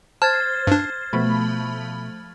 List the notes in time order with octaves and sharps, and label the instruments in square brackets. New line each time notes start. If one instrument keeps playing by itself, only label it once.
[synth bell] C5 [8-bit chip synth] A5 [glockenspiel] F6 G#6 A6
[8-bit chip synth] G2 D4
[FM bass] B2 [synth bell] F3 A3 B5